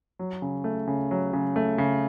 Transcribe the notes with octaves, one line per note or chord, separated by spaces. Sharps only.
F#3
C#3
A3
C#3
F#3
C#3
A3
C#3